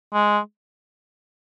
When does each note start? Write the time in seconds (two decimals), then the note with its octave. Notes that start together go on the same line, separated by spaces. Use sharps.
0.13 G#3